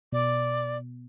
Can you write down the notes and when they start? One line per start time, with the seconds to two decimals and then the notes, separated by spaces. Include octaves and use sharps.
0.12 B2 D5